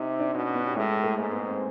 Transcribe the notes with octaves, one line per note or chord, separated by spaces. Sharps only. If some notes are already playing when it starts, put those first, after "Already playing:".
Already playing: C3 D#4 D#5
D4 D5
B2 C#4 C#5
B3 B4
G4
A2 G#3 G#4
A3 A4
G#2 A#3 A#4
B3 B4
C4 C5